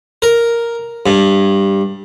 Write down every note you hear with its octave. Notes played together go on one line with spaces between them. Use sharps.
A#4
G2